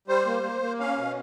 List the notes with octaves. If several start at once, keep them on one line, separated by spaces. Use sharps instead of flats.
G3 C5
A#3
A#3
A#3
C#4 F5
B2